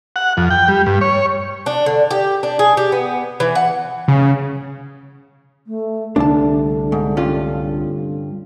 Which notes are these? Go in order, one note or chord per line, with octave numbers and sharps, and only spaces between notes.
F#5
F2
G5
G3
G2
C#5
D4
D3
G4
D4
G#4
G4
B3
E3
F#5
C#3
A3
C2 D3 A3 D4 A5
G#2
G2 C#4 F4